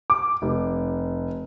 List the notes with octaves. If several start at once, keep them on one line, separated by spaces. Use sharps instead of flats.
D6
F1